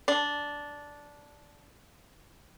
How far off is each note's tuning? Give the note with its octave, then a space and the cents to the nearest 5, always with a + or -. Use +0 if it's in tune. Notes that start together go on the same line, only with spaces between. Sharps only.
D4 -10